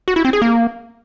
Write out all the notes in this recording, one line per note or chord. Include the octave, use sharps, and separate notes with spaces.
F#4
E4
C4
G#4
A#3